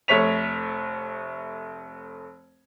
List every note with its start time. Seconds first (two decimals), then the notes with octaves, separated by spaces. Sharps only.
0.08 F1 A3 C#5 B6 F7